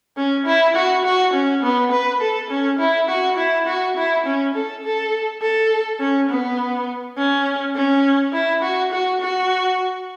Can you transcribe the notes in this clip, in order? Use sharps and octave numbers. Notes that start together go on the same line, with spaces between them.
C#4
E4
F#4
F#4
C#4
B3
B4
A4
C#4
E4
F#4
E4
F#4
E4
C#4
A4
A4
A4
C#4
B3
C#4
C#4
E4
F#4
F#4
F#4